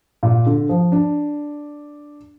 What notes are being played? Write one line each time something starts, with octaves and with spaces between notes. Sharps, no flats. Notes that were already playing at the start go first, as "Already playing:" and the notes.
A#2
D3
F3
D4